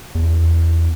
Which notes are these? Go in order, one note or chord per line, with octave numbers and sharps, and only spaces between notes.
E2